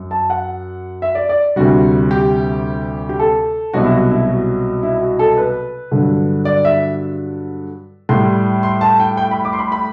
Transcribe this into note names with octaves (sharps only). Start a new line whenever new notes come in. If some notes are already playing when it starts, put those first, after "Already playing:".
Already playing: F#2 F#3
A5
F#5
E5
D5
D5
D2 C3 G3 F#4
G4
G4
A4
C2 B2 F#3 F#4
E4
F#4
E4
F#4
E4
F#4
A4
B4
G2 D3 F#3
D5
E5
A2 G3 C6
C6
A5
G5
G5
B5
D6
C6
B5
B5